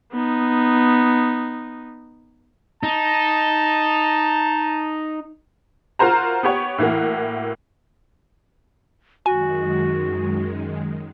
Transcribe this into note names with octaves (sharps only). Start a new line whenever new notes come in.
B3 D#4
D#4 A5
F4 F#4 A#4 C5 A#5
B3 G4 C#5
A2 E3 A#3 F#4
F#2 D#3 G#3 F#4 G#5